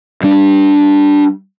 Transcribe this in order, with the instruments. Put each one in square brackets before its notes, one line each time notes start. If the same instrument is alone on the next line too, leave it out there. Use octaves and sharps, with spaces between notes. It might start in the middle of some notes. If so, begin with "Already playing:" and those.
[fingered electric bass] G3 D4